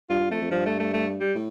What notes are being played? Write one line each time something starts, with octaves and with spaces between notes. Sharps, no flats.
G2 F4
G2
F2 A3
F2
G2 F3
A3
A3
A3
G3
A2